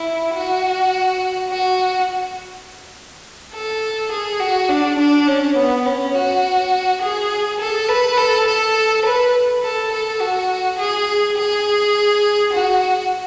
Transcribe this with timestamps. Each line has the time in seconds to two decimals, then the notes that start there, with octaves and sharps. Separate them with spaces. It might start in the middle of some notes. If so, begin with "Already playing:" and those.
Already playing: E4
0.34 F#4
1.50 F#4
3.54 A4
4.12 G#4
4.40 F#4
4.69 D4
4.99 D4
5.28 C#4
5.56 B3
5.86 C#4
6.15 F#4
7.02 G#4
7.60 A4
7.89 B4
8.18 A4
8.47 A4
9.05 B4
9.63 A4
9.92 A4
10.21 F#4
10.79 G#4
11.37 G#4
12.53 F#4